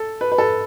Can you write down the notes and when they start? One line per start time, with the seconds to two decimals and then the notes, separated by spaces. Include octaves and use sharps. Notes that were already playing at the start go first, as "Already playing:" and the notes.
Already playing: A4
0.21 B4
0.32 B4
0.38 A4